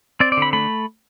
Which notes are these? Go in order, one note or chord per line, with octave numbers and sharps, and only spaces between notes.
C4 D5
D5
D3 B5
A3 B5